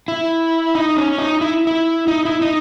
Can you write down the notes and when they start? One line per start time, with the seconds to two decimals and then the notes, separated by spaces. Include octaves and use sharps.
0.08 E4
0.75 D#4
0.97 C#4
1.18 D#4
1.41 E4
1.67 E4
2.08 D#4
2.25 E4
2.42 D#4